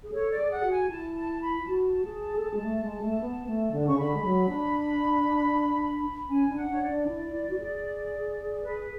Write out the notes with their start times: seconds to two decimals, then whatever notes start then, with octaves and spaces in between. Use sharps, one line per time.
0.03 G#4
0.12 A4 C#5
0.31 D5
0.38 G#4
0.51 F#5
0.64 F#4
0.70 G#5
0.90 E4 A5
1.15 A5
1.41 B5
1.66 F#4 A5
2.05 G#4
2.36 A4
2.44 G#4
2.54 G#3
2.62 A3
2.82 G#3
3.02 A3
3.21 B3
3.47 A3
3.72 D3
3.87 C#3 C#6
3.98 D3 B5
4.14 G#3
4.24 F#3
4.49 D4
6.29 C#4 G#5
6.49 D4
6.56 F#5
6.68 D4 C#5
6.80 D5
6.87 D4
7.07 E4
7.33 E4
7.49 F#4
7.58 G#4
8.62 B4